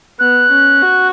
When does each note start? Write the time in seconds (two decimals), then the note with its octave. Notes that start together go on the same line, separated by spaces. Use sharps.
0.19 B3 F#6
0.51 C#4
0.82 F#4